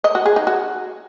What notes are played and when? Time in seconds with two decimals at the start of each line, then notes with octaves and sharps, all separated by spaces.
0.04 D#5
0.15 F#4
0.26 G#4
0.36 D#4
0.47 F#4